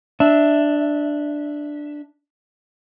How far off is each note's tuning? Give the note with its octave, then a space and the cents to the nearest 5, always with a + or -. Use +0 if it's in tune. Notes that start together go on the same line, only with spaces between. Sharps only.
D4 +5 E5 -10